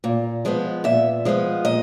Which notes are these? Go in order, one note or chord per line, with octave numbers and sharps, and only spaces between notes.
A#2
F3 G#3 B3
A#2 E5
F3 G#3 B3
A#2 D#5